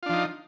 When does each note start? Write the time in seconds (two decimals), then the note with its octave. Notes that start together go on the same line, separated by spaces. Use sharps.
0.03 F4
0.06 D4
0.09 F3
0.13 D#4